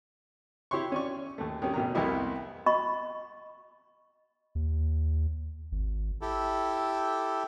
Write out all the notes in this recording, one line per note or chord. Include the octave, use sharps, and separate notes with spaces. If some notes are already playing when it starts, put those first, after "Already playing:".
E4 G4 C#5 C6 C#6
C#4 D5 C#6
D#2 A3
D#3 G3 C#4
A1 B2 D#3 A#5
C2 F2 A#3 B3 E4 D#5
D#5 B5 C#6
D#2
G#1
E4 G4 A4